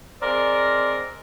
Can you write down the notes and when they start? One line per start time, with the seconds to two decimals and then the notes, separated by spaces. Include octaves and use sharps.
0.22 G#3 C4 A#4 D5